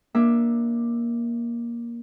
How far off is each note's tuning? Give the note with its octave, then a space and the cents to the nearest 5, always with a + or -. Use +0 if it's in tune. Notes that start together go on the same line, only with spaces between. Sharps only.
A#3 +15 D4 +5 E5 +0